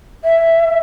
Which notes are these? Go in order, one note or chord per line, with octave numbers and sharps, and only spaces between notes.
E5